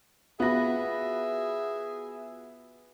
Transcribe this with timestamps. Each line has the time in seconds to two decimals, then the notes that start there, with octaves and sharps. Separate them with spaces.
0.40 B3 F4 F#4 G#4 E5 B5 A#6